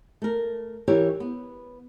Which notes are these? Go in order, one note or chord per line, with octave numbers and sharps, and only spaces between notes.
A3 A#4
E3 E4 G4 A#4 C#5
B3